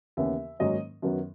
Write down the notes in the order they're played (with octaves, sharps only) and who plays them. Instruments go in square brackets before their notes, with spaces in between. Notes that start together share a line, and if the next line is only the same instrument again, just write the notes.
[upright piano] D#2 C#3 E3 B3 E5
G#2 D#3 F#3 A#3 C#4 D#5
F#2 D#3 F#3 B3